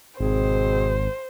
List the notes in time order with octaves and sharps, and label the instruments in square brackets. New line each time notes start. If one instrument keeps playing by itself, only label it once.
[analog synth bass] G#1 [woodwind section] B2 C4 G#4 [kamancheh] C5